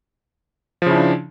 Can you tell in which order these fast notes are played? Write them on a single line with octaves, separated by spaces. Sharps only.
F3 C#3 E4 D4